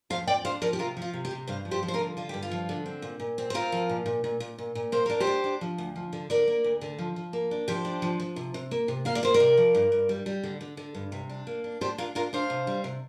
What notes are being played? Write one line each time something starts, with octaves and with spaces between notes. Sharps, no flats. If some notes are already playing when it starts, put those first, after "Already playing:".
F2 C5 F5
F2 D5 G5
D4 C5 F5
F3 A#4 D5
G4
C3 F4 A#4
F3
F4
C3
G4
C3
G2 C5 F5
F3
G4 C5
F3
C5
F4 A#4
D3
D3 F4
G2 G4
F4
F3
D3
C4
A#2
A#2
C4
C5
C4 F4 A#4
F3
A#2
A#2
A#2
A#2
A#2
A#2
A#3 C5
D4 A#4
G4 C5
D4
D4
F3
D2
F3
D3
D3 A#4 D5
A#3
D2
D3
F3
F3
A#3
D4
F3 G4 C5
D4
F3
F3
C3
C3
A#3
C3
A#3 F5
D5
A#3 C5
A#4 D5
C3
F3
G2
G2
G3
G3
D3
D3
D3
G2
C3
D4
A#3
D4
D4 G4 C5
D4 F4 A#4
D4 F4 A#4
D4 C5 F5
C3
G3
C3